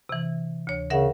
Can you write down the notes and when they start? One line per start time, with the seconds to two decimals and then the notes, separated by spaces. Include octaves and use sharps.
0.09 C3 E3
0.67 D2 C#5
0.90 C#3 A#4 E5 F#5